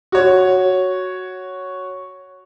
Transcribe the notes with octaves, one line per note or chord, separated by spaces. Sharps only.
F#4 C#5